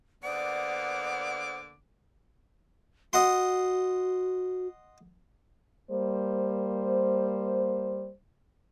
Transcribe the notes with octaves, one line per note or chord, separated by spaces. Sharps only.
D3 A#3 B3 C5 D5 F#5 D6 D#6
F#4 D#5 F#5 C6
G3 A#3 C5